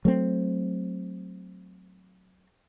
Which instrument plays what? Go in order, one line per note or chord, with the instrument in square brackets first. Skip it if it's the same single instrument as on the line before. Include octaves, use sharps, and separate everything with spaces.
[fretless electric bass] F#3 A3 C4